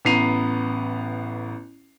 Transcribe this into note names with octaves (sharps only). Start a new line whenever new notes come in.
A1 B3 A#5 C7 D#7 F7